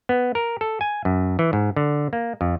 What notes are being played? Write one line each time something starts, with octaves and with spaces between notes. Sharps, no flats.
B3
A#4
A4
G#5
F#2
E3
G#2
D3
A#3
F2